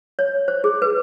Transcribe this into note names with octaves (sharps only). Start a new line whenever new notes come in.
C#5
C5
G#4
B4